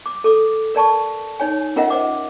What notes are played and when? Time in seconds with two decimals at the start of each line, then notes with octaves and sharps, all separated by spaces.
0.06 D6
0.24 A4 D6
0.75 A#4 D5 A5 C#6
1.40 D#4 C#5 G#5
1.76 C#4 F4 A#4 D#5 E5 F#5
1.90 C5 D6